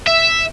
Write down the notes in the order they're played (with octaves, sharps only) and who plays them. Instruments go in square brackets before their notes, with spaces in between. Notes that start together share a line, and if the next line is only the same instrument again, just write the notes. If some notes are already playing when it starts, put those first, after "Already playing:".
[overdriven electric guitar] E5